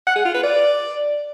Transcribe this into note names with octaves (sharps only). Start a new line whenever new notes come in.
F#5
G#4
F4
B4
D5